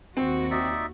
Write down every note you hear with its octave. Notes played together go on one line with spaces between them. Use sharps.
D#2 D#3 C4 F#4
D#4 D5 E5